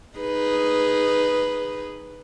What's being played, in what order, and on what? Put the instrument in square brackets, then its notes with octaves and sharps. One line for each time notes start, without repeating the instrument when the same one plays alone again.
[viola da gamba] D#4 G#4 B4